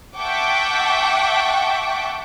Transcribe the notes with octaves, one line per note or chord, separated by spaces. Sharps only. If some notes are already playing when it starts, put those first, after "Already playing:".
E5 F#5 G5 A5 C#6 D6